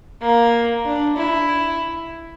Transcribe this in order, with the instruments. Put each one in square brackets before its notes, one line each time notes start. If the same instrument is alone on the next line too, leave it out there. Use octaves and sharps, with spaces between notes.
[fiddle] A#3
D4
E4